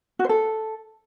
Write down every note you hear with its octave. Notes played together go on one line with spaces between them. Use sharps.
F#4
C5
A4